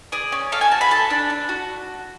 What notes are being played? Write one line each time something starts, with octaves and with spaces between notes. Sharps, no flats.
G#4 D5
C#4
A4 F5
G#5
F#4 A5
B5
A4 A5
D4
D4
F#4